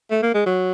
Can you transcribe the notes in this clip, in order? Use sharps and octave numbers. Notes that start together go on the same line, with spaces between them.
A3
A#3
G#3
F#3